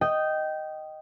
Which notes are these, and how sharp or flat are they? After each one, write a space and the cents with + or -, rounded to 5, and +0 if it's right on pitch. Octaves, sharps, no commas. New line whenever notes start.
D#5 +0 G5 -15